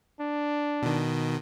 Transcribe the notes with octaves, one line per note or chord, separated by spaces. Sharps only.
D4
B2 D#3